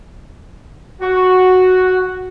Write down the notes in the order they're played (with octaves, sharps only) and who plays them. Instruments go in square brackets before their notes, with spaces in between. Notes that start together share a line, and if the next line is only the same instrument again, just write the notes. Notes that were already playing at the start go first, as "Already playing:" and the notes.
[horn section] F#4